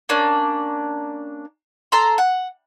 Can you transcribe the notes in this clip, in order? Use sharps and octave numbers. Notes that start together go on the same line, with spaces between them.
A#3 C#4 D4
A4 A#5 C6
F#5